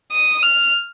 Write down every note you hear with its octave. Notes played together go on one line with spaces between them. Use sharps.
D#6
F6